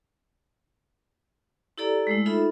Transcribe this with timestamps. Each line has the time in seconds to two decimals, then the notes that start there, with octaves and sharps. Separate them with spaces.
1.78 E4 G4 A4 D5 A#5
2.07 G#3 A3 E4
2.26 D#4 F4 A4 E5 B5